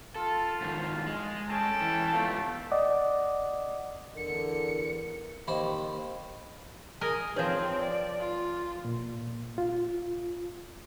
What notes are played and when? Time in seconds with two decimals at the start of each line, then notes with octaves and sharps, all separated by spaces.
0.16 F4 A4
0.61 G#2 D#3 F3
1.07 G#3
1.48 C#4 A4 G5 A5
1.81 E3
2.13 G#2 A3 B3 F4
2.71 D5 D#5 F#5 D6 D#6
4.17 E2 D3 A#4 C#7
5.47 D#2 C5 B5
7.01 G#4 A#4 D#5 G#5
7.36 F3 C4 G#4 B4 C#5
7.82 D5
8.20 F4
8.85 A#2
9.58 F4